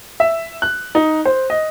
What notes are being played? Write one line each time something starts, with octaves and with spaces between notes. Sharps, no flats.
E5
F#6
D#4
C5
D#5